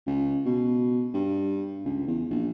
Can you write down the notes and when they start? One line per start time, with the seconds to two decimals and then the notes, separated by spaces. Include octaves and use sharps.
0.06 C#2
0.46 B2
1.14 G2
1.85 C#2
2.07 E2
2.30 A#1